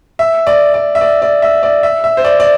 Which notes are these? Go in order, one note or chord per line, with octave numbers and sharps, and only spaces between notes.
E5
D5
D5
E5
D5
D5
E5
D5
E5
E5
C5
D5
D5